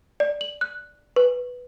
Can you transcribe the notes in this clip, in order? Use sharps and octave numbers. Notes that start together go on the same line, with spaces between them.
D5
F#7
F#6
B4